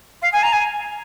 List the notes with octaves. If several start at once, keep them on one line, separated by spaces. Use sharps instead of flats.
F5
G#5
A#5
G#5